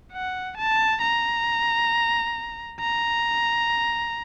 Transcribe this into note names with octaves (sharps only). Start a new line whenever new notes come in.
F#5
A5
A#5
A#5